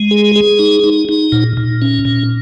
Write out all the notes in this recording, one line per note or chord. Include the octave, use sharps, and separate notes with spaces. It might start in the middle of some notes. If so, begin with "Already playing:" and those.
Already playing: G#3
G#4
G#4
D#4
D#4
D#4
A#2
A#2
C#4
A#2